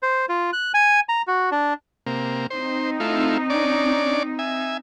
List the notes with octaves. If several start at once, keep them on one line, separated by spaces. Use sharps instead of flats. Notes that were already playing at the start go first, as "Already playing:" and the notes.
C5
F4
F#6
G#5
A#5
F#4
D4
C3 A#3
C4 D#4 C5
A3 E4 F4
C#4 D4 D5
E5 G#5